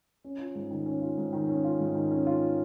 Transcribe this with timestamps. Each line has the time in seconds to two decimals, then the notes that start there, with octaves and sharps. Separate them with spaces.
0.24 C#4
0.39 F4
0.55 G#2
0.71 D#3
0.86 C#4
1.01 F4
1.17 G#2
1.33 D#3
1.49 C#4
1.64 F4
1.79 G#2
1.95 D#3
2.11 C#4
2.27 F4